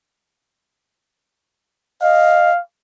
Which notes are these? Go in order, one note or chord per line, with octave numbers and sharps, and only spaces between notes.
D#5 F5